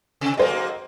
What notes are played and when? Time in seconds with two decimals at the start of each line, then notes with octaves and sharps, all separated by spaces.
0.21 C3
0.37 G#2 F#3 A#3 A4 C5 D#5